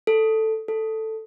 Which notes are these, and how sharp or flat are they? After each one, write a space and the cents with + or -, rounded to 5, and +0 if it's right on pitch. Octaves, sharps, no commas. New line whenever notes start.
A4 +5
A4 +5